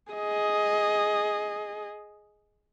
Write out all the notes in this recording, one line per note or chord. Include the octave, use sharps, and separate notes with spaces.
G#4 D#5